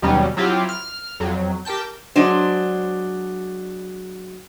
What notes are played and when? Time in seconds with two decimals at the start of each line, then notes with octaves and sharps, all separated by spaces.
0.02 D#2 B2 F#3 G3 C#4
0.37 F#3 C4 E4 F4 G4
0.69 F6
1.20 F2 F#3
1.65 G4 A#4 G5 A5 G6
2.15 F#3 G#3 D4 C5